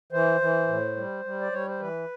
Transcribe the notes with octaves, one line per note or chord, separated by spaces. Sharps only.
E3 C5
E3
A2
G3
G3
D5
G3 C#5
C5
E3 B4